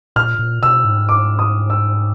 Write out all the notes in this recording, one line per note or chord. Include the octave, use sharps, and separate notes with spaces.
A#2 F6
A#2
B2 E6
G#2
D6
D#6
E6